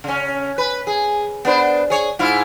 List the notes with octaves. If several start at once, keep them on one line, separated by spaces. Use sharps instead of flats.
C#3 C#4
B4
G#4
B3 D4 C5
G#4 C#5
G#2 E4 F4